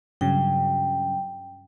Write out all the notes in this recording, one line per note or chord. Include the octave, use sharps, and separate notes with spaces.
G2 C#3 F#3 G5